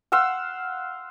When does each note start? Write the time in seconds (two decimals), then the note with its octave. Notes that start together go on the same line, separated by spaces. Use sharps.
0.12 F5 F#5 C6 E6